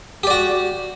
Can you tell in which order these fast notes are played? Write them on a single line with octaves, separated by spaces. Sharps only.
G4 D5 F#4